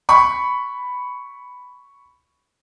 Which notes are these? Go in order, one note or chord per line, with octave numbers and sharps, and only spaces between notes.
B5 C#6